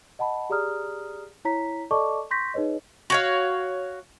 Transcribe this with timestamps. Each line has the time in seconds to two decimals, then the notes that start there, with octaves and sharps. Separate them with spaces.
0.19 D#5 F#5 A5 B5
0.50 G4 G#4 D5 A#5 D#6 F6
1.45 E4 C#5 A#5 B6
1.91 A4 D5 D#5 A5 C#6 D6
2.31 C6 C#6 G6 A#6 B6
2.54 D#4 G#4 B4 C#5 D#5
3.10 F#4 C#5 F5